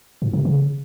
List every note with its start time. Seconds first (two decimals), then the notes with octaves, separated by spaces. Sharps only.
0.22 G#2
0.33 C3
0.45 C#3